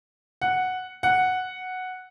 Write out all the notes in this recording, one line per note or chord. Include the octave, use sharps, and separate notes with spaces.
F#5
F#5